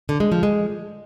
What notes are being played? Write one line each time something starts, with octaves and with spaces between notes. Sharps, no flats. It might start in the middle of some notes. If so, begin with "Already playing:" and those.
D3
G#3
F3
G#3